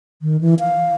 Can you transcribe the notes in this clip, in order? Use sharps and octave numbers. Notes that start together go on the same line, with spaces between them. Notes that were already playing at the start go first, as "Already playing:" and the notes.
D#3
E3
F5